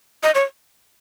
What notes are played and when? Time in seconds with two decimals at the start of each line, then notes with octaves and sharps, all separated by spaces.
0.23 D#5
0.35 C#5